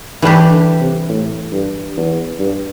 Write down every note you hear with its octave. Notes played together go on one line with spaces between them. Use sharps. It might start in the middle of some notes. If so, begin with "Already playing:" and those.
D3 E3 G3 D4 G4
D3
C3
A2
G2
E2
G2